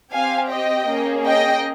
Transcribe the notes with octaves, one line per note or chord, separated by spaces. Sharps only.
C4 G4 F5 G#5
D#5 G5
A#3 C#4 G#4
D#5 G5